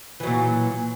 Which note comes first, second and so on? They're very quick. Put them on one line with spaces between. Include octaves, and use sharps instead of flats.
E3 F#3 A#2